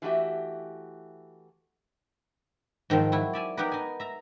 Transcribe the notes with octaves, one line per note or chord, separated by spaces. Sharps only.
E3 A3 F#4 G4 E5
G#2 D#3 F3 C4
F#3 E4
D5 E5 G#5
B3 D#4 G4 A#4 B4
D#4 G#5
E5 A#5